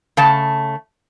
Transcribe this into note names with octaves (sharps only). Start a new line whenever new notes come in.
C#3 A3 A5